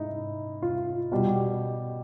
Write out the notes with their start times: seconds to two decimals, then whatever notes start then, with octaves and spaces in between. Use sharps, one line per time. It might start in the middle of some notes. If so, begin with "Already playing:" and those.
Already playing: G#2 D#4 E4
0.62 F4
1.12 B2 G3 F#4
1.36 G4